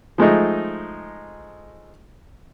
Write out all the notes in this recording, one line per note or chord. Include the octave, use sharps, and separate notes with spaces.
F3 G#3 A3 D#4